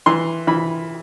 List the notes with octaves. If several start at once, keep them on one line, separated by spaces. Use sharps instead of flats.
E3 C6
E3 B5